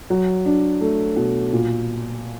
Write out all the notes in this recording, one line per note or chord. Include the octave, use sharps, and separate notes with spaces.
F#3
D4
A3
B2
A#2